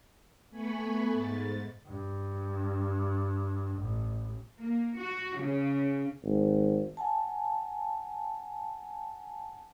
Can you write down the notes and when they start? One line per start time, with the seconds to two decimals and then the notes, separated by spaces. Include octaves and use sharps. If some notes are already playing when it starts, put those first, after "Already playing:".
0.50 A3 B3 G#5 B5 C#6
1.13 G#2 A6
1.86 G2
3.79 A1
4.59 A#3
4.99 F#4
5.38 C#3
6.23 G#1
6.97 F#5 G#5 A5